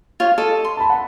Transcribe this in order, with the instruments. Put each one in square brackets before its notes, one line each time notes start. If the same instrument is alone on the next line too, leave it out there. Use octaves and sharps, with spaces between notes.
[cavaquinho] F4 C#5
A4 D#5
C6
[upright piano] A5 B5
F#5